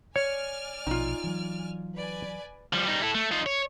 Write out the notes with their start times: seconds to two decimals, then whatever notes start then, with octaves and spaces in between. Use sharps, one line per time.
0.16 C#5 D5 G#5 F6
0.87 A#1 B2 F3 D#4 F4
1.24 E3 F#3
1.95 B4 D5 G#5
2.73 F3 G3
2.86 G3 D#4
3.02 E4 A4
3.15 A3
3.32 D#4 F4
3.46 C#5